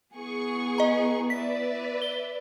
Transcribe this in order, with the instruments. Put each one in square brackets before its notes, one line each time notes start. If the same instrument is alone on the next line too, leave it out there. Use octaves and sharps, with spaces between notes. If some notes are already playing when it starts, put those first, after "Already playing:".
[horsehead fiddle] B3 E4 [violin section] G#4 C#6
[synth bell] D#5 A#5
[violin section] B4 D5 E5 [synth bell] B6
[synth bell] G7